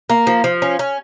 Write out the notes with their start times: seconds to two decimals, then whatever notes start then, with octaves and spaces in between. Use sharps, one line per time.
0.10 A#3
0.27 F3
0.44 F3
0.62 C#4
0.79 C#4